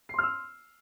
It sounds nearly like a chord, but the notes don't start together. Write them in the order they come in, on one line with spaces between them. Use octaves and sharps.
C7 C6 F6 E6